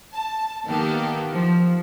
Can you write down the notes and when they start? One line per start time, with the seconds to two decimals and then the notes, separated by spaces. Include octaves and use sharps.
0.13 A5
0.66 D#3 A#3 B3 G4 A4
1.33 F3